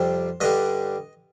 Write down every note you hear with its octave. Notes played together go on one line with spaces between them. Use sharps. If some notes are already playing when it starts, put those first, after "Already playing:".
Already playing: F2 C3 G3 C5
G2 D3 G3 D#5